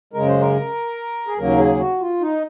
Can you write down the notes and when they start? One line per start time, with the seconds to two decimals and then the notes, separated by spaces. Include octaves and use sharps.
0.13 F#2 C#3 G#3 A#4
0.28 C5
0.41 A#4
1.27 G#4
1.38 D#2 C#3 F#3 A#3 A#4
1.59 G#4
1.80 F#4
2.01 F4
2.21 D#4